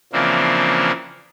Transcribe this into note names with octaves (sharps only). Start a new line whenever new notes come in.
C#3 E3 F3 A#3 C4 D4